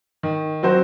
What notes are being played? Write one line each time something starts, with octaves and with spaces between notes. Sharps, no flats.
D#3
F#3 C4 F#4 C5